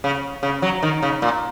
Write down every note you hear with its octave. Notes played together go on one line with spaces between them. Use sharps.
C#3
C#3
F#3
D#3
C#3
A#2